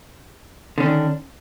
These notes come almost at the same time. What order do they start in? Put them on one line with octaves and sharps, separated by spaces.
D3 C#4 D#3 D4